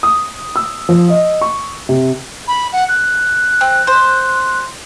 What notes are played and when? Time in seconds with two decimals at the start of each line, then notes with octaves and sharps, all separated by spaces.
0.03 D#6
0.56 E6
0.89 F3
1.09 D#5
1.41 C#6
1.89 C3
2.48 B5
2.73 F#5
2.89 F#6
3.61 C4
3.87 C5